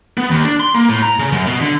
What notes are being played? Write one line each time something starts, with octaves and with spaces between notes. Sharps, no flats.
B3
D#2
D4
C6
A#3
A2
A#5
C#3
F#2
B2
D3